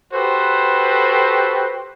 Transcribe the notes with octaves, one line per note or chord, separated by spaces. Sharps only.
F#4 G4 A4 B4 C5